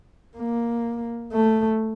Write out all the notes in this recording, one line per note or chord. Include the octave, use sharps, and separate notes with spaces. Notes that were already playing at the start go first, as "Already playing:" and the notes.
A#3
A3